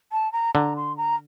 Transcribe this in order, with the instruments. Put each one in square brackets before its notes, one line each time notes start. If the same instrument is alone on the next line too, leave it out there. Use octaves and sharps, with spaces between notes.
[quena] A5
A#5
[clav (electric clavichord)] D3 [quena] A#5
[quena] C6
A#5